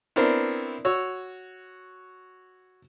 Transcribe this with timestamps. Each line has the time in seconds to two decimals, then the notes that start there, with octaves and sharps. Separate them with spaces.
0.16 B3 C4 D4 E4 A#4 C5
0.85 F#4 C#5 E6